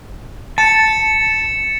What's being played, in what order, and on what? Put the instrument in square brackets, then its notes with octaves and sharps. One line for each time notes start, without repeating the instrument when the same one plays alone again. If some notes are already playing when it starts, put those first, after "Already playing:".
[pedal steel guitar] A5 [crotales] A6 C#7 E7